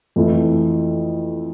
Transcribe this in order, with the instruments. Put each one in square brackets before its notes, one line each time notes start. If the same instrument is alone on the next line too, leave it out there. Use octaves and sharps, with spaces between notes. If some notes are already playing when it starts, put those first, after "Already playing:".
[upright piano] F2 E3 A3 E4